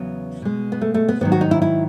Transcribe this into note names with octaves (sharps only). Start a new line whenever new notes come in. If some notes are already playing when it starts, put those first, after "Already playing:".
Already playing: E2 C#3 F#3 B3
B2 G#3
B3
A3
A3
B3
G#2 D#3 F#3 B3
F#4
D#4
E4
E4